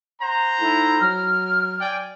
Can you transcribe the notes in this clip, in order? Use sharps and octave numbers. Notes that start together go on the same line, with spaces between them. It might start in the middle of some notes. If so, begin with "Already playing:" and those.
C5 F#5 A#5
A3 D#4 E4
F#3 F6
D5 G5 G#5